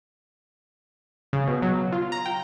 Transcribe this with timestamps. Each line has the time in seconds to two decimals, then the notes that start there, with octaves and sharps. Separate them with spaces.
1.33 C#3
1.47 B2
1.62 F#3
1.92 F4
2.12 A#5
2.26 G5